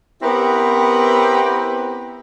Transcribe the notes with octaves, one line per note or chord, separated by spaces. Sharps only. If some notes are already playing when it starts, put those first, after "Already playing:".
B3 C4 E4 G4 A#4 B4